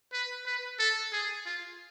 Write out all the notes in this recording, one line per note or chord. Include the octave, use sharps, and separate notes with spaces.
B4
B4
A4
G#4
F4